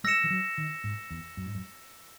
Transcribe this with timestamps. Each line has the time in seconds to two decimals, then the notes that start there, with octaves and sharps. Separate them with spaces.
0.04 G#3 E6 A#6 C#7 E7
0.24 E3
0.30 F#3
0.58 D#3
0.84 G#2
1.11 E2
1.37 F#2
1.46 G#2
1.55 F#2